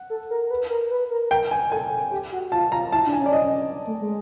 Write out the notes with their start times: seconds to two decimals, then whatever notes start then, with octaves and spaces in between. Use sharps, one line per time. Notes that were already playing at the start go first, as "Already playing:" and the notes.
Already playing: F#5
0.10 A4
0.30 A#4
0.50 B4
0.70 A#4
0.91 B4
1.11 A#4
1.31 A#4 G5
1.51 G#5
1.72 A4 G#5
2.11 G4
2.32 F#4
2.52 F4 A5
2.72 F4 A#5
2.92 E4 A5
3.07 D4
3.13 G#5
3.19 C#4
3.26 D5
3.32 D#5
3.87 A3
4.01 G#3